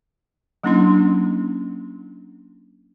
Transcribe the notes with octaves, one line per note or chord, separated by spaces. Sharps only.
F#3 A#3 C#4 D4 E4 C6